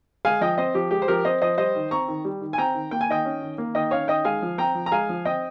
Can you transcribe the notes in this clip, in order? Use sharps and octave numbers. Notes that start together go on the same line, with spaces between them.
G#3 F5 G#5
F3 D#5 G5
C4 C5 D#5
F3 G4
G#3 G4
C5
F3 G4 A#4
C4 C5 D#5
F3 C5 D#5
G3 C5 D#5
D#3
C4 A#5 C#6
D#3
G3
D#3
G#5
C4 G5 A#5
D#3
A#3 G5
G#5
D#3 D#5 G5
C#4
D#3
A#3
D#3 D#5 G5
C#4 C#5 F5
D#3 D#5 G5
G#3 F5 G#5
F3
C4 G5 A#5
F3
A#5
G#3 F5 G#5
F3
C4 D#5 G5